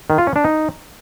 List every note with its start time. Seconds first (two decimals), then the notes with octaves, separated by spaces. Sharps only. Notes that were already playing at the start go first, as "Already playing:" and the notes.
0.10 D#3
0.18 F4
0.27 C#4
0.36 D4
0.44 D#4